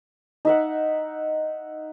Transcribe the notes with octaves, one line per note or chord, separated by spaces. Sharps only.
D#4 E5 F#5